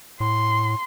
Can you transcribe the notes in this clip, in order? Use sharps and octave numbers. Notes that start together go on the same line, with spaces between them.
A2 C6